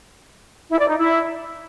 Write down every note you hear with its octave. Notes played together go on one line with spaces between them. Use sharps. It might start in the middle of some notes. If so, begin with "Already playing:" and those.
E4
D5
D#4
E4